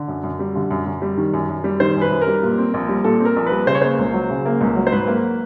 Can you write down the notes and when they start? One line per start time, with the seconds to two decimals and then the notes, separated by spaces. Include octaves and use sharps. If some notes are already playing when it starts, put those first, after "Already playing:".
Already playing: D3
0.08 F#2
0.24 F#2
0.39 G3
0.56 D3
0.71 F#2
0.86 F#2
1.02 G3
1.17 D#3
1.34 F#2
1.49 F#2
1.64 G3
1.80 D#3 C5
1.96 F#2
2.01 B4
2.11 F#2
2.21 A#4
2.27 G3
2.43 A#2
2.58 C4
2.74 A#1
2.89 G3
3.04 A#2 A4
3.20 C4 A#4
3.36 A#1
3.47 G3 B4
3.67 C#3 C5
3.75 C#5
3.82 A#3 C5
3.99 C#2
4.14 F#3
4.30 C#3
4.46 A#3
4.61 C#2
4.76 F#3
4.87 C5
4.92 G#2 B4
5.07 A#3